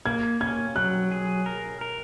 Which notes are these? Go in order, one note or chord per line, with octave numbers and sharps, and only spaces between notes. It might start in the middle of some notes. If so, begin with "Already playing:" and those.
A#3 G#6
C#4 G#6
F#3 F#6
G#4
A#4
A#4